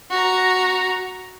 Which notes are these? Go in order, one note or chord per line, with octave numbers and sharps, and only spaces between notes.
F#4 A#5